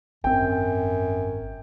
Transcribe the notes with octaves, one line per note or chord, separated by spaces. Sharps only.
G#1 F#2 C4 G5